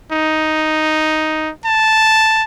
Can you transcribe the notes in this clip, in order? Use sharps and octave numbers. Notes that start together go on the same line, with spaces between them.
D#4
A5